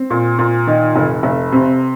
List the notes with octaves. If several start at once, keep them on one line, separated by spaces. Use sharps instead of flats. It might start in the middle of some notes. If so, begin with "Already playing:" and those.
Already playing: C4
A#2
A#2
D#3
F1
F1
C3